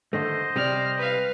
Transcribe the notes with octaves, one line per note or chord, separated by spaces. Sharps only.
D3 D#3 A3 C5 D#5
C3 G3 D5 F6
B4 F5